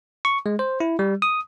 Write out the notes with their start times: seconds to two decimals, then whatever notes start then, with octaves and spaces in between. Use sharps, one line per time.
0.25 C#6
0.46 G#3
0.59 C5
0.80 E4
0.99 G3
1.22 D#6